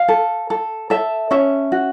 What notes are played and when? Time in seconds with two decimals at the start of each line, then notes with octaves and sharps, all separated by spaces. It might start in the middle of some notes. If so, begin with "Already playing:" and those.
Already playing: F5
0.08 A4
0.50 A4
0.90 A4 E5
1.31 C#4 E5
1.72 F#4